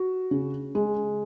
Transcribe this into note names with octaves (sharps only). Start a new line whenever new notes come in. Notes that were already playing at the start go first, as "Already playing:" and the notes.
Already playing: F#4
C#3
G#3